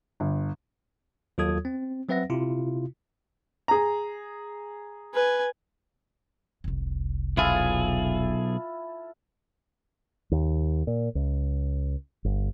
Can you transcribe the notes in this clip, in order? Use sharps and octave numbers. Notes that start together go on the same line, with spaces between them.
G1
D#2 F#3 F4 A4 D#6 G#6
C4
F#3 C4 B4 E5 F#5 A#6
C3 E4 F4
G#4 A#5
B4 G#5
F1 C2
B1 E4 F4 G#4 A4
D#2
A#2
C#2
G1